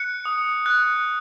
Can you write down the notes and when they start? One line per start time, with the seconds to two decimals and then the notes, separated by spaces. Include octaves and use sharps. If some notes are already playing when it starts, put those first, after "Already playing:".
Already playing: F#6 C#7
0.25 D#6
0.66 F#6